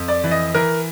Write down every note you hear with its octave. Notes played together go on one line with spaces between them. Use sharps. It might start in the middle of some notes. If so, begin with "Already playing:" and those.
Already playing: F2
D5
E3
D#5
E3 A#4